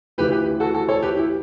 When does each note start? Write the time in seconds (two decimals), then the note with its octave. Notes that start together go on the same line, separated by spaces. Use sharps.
0.18 D2 C#3 E3 G4 B4
0.32 G4 B4
0.60 F#4 A4
0.74 F#4 A4
0.89 A4 C#5
1.02 G4 B4
1.17 E4 G4